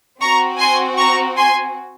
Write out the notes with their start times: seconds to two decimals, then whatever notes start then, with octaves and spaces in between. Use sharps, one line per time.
0.20 C4 F#4 A#5 C#6
0.59 G#5 C6
0.98 A#5 C#6
1.37 G#5 C6